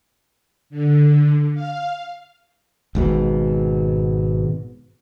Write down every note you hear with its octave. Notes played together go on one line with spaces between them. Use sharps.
D3
F5
G#1 G#2 B2